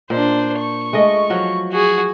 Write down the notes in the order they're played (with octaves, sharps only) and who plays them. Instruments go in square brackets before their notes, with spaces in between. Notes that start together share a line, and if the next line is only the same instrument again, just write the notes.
[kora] A#2 [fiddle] D4 C5
[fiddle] C#6
[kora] G#3 A3 D#5
F3 F#3
[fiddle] F#4 G#4